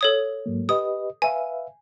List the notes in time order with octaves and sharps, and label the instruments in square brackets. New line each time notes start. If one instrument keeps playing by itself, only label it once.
[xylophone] A4 C#5 D#6
[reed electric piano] G#2 F#3 A#3
[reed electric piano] G4 B4 D#5 [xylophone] D#6
[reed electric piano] B4 E5 F5 [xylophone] G#5